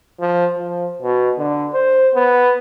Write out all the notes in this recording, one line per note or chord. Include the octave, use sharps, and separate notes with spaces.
F3
F3
B2
D3
C5
B3